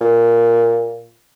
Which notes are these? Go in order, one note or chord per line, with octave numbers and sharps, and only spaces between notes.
A#2